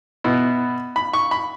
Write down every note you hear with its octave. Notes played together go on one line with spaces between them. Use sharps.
B2 B3 E4
B5
C#6
B5